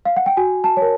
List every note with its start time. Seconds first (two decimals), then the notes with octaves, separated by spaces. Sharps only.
0.05 F5
0.16 F#5
0.26 G5
0.37 F#4 G#5
0.64 A5
0.77 A#4 C#5